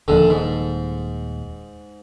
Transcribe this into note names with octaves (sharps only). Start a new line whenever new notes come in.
D#1 A#1 D#2 D3
G#2